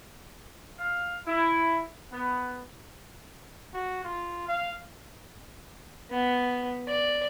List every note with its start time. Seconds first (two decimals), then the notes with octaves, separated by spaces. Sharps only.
0.79 F5
1.26 E4
2.12 B3
3.74 F#4
4.04 F4
4.49 F5
6.11 B3
6.87 D5